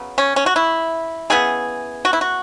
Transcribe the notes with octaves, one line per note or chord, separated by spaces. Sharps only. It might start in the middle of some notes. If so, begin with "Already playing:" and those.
Already playing: C#3 F#3 B3
C#4
C#4
F#4
E4
C#3 E3 B3 G#4
F#4
E4
F#4